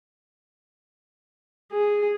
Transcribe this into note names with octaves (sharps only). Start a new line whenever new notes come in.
G#4